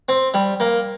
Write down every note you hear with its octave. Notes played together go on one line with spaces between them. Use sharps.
C4
G3
A#3